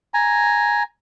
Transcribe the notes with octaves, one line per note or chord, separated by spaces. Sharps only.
G#5 A#5